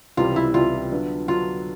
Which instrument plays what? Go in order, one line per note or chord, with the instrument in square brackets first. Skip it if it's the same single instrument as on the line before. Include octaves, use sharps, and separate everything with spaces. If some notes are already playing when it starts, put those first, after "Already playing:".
[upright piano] C#2 C3 E3 G3 [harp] F4
[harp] E4
[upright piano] C#2 C3 E3 G3 [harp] F4
[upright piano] D3 F#3 B3 D4
[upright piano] D3 F#3 B3 D4 [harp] F4